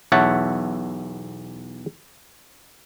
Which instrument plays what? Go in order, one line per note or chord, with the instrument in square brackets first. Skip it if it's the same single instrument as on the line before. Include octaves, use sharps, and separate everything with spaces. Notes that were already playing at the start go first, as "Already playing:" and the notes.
[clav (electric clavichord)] B1 E2 C#5 E5 F#5 A5